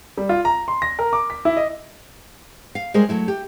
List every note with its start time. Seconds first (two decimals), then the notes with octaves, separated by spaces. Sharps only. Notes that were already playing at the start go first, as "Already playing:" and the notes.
0.18 G3
0.29 F4
0.45 A#5
0.68 C6
0.82 A#6
0.99 A#4
1.13 D6
1.30 B6
1.45 E4
1.57 D#5
2.75 F5
2.94 G3 G#3 G#4 A#4 C5
3.09 F#3 A3 E4
3.28 G4